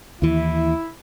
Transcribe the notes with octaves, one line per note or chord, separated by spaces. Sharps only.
D#2 E3 E4